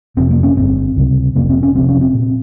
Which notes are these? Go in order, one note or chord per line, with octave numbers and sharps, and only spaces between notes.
F1 F2 C3 C4
A#3
C#4
G1 G2 C4
C#2 C3
F1 F2 C3 A#3
C4
C#4
F1 F2 C3 C4
C#4
C4
A#2